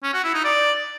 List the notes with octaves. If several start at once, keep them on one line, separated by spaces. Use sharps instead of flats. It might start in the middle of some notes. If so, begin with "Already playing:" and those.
C#4
F#4
E4
D#4
D5